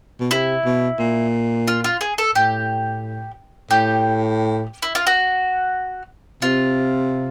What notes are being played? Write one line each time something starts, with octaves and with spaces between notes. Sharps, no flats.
B2
C3 E4
B2
A#2
F4
F4
G#4
A4
A2 G4
A2 G4
E4
F4
F#4
C3 F4